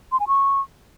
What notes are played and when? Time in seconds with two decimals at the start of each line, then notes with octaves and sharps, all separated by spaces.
0.12 C6
0.20 G#5
0.28 C#6